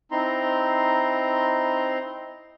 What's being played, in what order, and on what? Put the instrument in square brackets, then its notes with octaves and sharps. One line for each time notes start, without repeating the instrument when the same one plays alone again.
[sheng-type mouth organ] C4 D#4 E4 A#5 C6